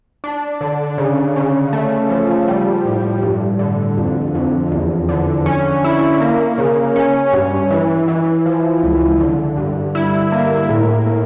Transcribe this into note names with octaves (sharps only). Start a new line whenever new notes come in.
D4
D3
C#3
C#3
A3
F3
G3
A2
G2
D3
F2
F2
E2
D3
C#4
E4
A#3
C#3
C#4
G2
E3
E3
F3
C#2
D3
G2
E4
A#3
A2
A2